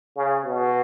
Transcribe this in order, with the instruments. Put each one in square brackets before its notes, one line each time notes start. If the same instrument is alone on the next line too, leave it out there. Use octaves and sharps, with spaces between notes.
[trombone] C#3
B2